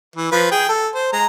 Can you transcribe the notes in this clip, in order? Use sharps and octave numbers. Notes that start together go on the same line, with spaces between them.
E3
F3 B4
G#4 G5
A4
C5
G#3 A#5